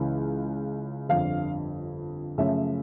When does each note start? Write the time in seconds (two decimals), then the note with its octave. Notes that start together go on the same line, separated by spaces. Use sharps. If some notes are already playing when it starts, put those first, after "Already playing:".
Already playing: C#2 C#3 E3
1.09 G1 F2 D3 F5
2.38 F#2 C#3 F3 A3 E5